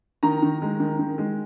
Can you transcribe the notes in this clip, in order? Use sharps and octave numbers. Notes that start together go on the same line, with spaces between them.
D#3 A#5
D#3
G#3
D#3
D#3
G#3